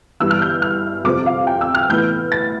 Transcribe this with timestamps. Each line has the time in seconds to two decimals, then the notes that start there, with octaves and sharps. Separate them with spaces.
0.20 G2 E3 G3 B3 E6
0.31 F6
0.42 G6
0.62 F6
1.04 F2 C3 F3 C4 D6
1.26 F5
1.47 G5
1.61 E6
1.75 F6
1.89 A2 E3 B3 G6
2.32 A6